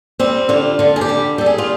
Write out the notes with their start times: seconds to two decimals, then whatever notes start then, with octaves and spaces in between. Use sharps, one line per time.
0.19 G3 C4
0.49 D3 F4
0.79 D3 F4
0.96 G#4
1.01 G4
1.09 G3
1.38 G3 A4
1.46 G#4
1.58 F4